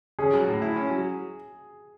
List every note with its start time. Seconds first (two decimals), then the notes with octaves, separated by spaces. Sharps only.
0.19 C#4 G#4
0.33 F#3
0.48 A2
0.62 E4
0.76 C#4
0.90 F#3